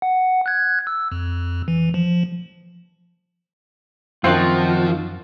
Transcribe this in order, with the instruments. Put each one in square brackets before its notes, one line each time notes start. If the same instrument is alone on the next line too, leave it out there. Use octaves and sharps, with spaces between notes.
[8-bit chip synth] F#5
F#6 G#6
E6
F2
E3
F3
[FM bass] F#2 [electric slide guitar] D#3 F4 [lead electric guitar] F3 [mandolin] C4 F#4 A5